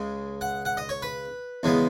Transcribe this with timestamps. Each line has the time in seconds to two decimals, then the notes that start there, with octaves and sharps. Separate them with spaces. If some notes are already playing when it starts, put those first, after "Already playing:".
Already playing: C#2 C#3 G#3
0.41 F#5
0.65 F#5
0.77 D#5
0.89 C#5
1.02 B4
1.63 E2 C#3 G#3 B3